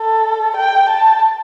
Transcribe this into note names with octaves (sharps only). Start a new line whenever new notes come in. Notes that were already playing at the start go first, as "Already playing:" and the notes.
Already playing: A4
G5
A5